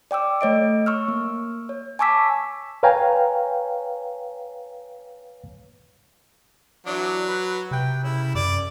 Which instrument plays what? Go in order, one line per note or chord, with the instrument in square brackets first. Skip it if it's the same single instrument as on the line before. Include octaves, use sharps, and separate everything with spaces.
[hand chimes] D5 G5 D6 E6
A3 C#5 D#5 D7
C#6 E6 F6
A#3
C#5
G#5 A5 C#6 D6 E6 B6
[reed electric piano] B4 C#5 F5 G5 G#5 A#5
[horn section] E3 D4 [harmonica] F#3
[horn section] B4
[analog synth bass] C3 [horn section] B4 G5
[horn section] C#3 [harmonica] E4
[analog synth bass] F#2 [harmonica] D5